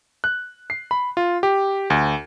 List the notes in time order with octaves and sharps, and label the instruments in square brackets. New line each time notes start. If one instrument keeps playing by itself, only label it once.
[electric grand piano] F#6
C7
B5
F4
G4
D2